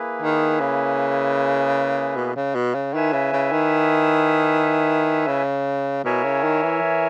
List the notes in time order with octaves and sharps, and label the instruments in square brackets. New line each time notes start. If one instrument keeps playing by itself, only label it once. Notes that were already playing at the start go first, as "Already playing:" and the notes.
Already playing: [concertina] A#3 E4 G#4 B4
[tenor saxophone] D#3
C#3
B2
C#3
B2
C#3
[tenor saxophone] D#3 [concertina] E4 B4 E5 G#5
[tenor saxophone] C#3
C#3
D#3
C#3
[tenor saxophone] B2 [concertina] E4 A#4 C#5 E5 G#5
[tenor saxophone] C#3
D#3
E3
E3